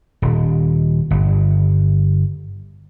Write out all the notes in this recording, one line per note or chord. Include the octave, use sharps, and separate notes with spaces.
D#1
G1